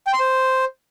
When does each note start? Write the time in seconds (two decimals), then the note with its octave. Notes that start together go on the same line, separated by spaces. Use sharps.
0.07 G5
0.13 C6
0.20 C5